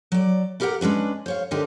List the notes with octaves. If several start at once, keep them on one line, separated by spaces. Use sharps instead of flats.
F#3 D5
E4 G4 A#4 B4 F#5 A#5
G#3 C#4 D4 B4
C5 C#5 F5
D3 D4 D#4 G4 A#4 C5